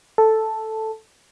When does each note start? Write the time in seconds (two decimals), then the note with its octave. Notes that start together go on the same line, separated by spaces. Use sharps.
0.18 A4